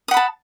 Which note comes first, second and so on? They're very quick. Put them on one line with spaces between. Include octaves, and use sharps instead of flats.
D#6 F#5 B5 A5